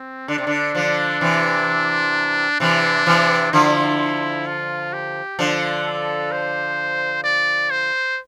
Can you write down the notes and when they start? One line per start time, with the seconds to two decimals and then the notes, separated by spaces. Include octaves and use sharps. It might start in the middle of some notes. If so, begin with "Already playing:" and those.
Already playing: C4
0.28 D3 D4
0.38 C3
0.47 D3
0.75 D3 F3
1.21 C3 E3
2.60 C3 E3 D4
3.06 C3 E3
3.53 D3 F3 E4
4.46 F4
4.93 G4
5.39 D3 F3
5.85 A4
6.32 C5
7.24 D5
7.70 C5